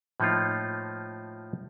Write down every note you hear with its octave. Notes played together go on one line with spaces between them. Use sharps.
A2 F3 A#3 D#4 F4